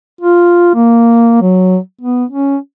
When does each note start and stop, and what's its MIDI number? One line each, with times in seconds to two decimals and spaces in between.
0.21 0.70 65
0.75 1.37 58
1.42 1.78 54
2.01 2.25 59
2.31 2.57 61